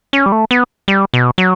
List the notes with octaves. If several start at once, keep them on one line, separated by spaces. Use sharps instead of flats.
C#4
G3
A3
B3
G3
B2
F#3